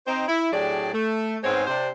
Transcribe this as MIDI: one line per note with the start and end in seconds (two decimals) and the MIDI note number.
0.07 0.25 60
0.07 0.25 63
0.07 0.25 72
0.28 0.51 64
0.53 0.93 45
0.53 0.93 54
0.53 0.93 62
0.53 0.93 67
0.53 0.93 68
0.53 0.93 74
0.94 1.38 57
1.44 1.63 44
1.44 1.63 56
1.44 1.63 59
1.44 1.63 60
1.44 1.63 72
1.44 1.63 73
1.67 1.90 48
1.67 1.90 62
1.67 1.90 72